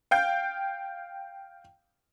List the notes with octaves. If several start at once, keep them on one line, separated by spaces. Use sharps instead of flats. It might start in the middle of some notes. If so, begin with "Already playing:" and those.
F5 G5 G6